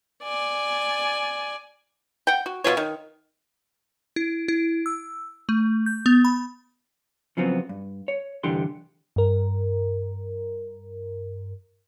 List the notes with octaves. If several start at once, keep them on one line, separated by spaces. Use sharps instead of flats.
D5 G#5
F#5 G5
F#4
B2 A#3 F4 C#5
D#3
E4
E4
E6
A3
G6
B3
B5
C#3 F3 F#3 B3 C4
G2
C#5
C2 G2 D3 E3 G4 C6
G2 A#4